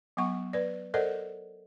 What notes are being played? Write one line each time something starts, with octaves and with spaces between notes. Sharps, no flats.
F#3 B3 F#5 C#6
B4 D5
A4 A#4 C5 D5 D#5 F#5